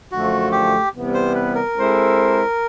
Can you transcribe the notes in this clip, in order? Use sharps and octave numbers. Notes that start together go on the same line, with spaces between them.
F#2 D3 F3 A3 F#4
G4
C3 E3 G3 B3
C5
B4
A#4
G#3 C4 E4 A4 C5